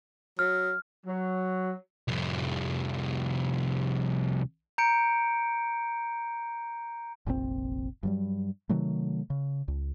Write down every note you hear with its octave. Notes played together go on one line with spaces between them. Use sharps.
F#3 F6
F#3
C2 F2
A#5 G6 C#7 D7
F1 A#1 C3 C4
G2 F#3 G3
C3 D#3 F#3 A3
C#3
C#2